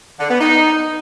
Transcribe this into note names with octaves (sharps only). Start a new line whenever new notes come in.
D3
B3
D#4